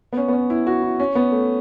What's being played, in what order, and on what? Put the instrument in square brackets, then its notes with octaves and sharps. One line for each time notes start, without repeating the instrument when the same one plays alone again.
[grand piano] B3
C#4
B3
C#4
E4
F#4
E4
C#4
B3
A3